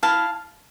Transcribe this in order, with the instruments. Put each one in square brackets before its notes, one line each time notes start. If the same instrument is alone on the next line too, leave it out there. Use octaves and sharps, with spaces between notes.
[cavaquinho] E4 F5 A5